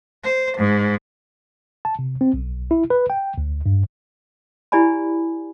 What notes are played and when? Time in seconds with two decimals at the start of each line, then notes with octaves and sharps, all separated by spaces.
0.23 C5
0.57 G#2
1.85 A5
1.99 C3
2.21 C4
2.34 B1
2.71 E4
2.90 B4
3.10 G5
3.38 D2
3.66 G2
4.72 E4 G4 D5 G#5 B5